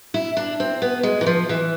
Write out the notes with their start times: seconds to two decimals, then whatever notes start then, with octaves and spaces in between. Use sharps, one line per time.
0.14 E4
0.37 D4
0.60 C4
0.82 B3
1.03 G#3
1.21 E3
1.26 F3
1.49 E3